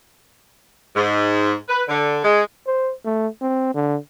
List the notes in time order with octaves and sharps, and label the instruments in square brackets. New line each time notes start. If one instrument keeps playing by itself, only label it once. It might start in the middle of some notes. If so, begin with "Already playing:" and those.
[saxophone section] G#2
B4
D3
G#3
[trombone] C5
A3
C4
D3